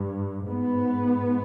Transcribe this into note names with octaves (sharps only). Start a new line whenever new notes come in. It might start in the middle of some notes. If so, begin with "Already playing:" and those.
Already playing: G2
G#2 B3